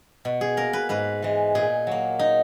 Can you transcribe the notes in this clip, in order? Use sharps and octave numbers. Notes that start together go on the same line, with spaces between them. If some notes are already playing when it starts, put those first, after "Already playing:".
B2
G#4
A#3 A#4
B4
G#2 B4
E3 G#3
A#2 G#4
F#3 A#3
D#4